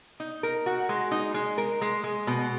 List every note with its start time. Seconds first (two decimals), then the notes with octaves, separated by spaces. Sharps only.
0.20 D#4
0.43 A#4
0.66 F#4
0.89 G#3
1.11 D#4
1.34 G#3
1.58 A#4
1.81 G#3
2.04 G#3
2.27 B2